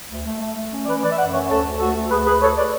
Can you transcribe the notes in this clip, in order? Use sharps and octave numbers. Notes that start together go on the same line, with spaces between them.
D2
A3
A3
A3
C#4
E3 B4 D5
E3 B4 D5
E5
F#2 D5 F#5
C#4 C#5 E5
D2 A4 C#5
D2
A3 F#4 A4
D2
D2 G#4 B4
D2 G#4 B4
D2 A4 C#5
B4 D5